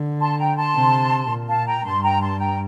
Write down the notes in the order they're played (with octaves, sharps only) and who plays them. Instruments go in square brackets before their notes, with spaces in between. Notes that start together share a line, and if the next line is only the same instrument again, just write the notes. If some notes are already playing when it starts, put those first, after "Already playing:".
Already playing: [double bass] D3
[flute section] A5 C6
G5 A#5
A5 C6
[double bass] C3
A#2
[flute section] F5 A5
G5 A#5
[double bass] G2 [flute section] A5 C6
[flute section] G5 A#5
A5 C6
G5 A#5